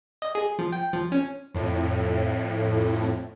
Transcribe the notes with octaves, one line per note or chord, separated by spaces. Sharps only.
D#5
G#4
F3
G5
F3
C#4
F2 A2